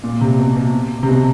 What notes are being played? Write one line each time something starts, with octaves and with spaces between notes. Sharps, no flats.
A#2
C3
B2
B2
C3
B2